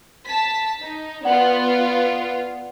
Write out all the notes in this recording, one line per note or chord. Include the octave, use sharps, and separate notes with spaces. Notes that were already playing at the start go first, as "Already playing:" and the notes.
A5 B6
D#4
B3 F4 D5 F#5